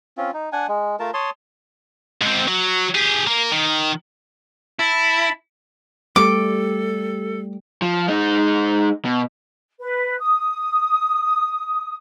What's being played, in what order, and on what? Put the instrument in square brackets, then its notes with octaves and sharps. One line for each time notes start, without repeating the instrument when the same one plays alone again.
[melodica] C4 C#4 F4
D#4
D4 F#5 G#5
G#3
A3 F4 A#4 A5
C#5 A5 C6 D#6
[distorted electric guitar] G#2 C4
F#3
G4 G#4
A#3
D#3
[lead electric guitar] E4 [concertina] A5 B5
[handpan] G3 A3 G4 [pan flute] A4 [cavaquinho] D6
[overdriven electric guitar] F3
G#3 D#4
B2
[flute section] B4
D#6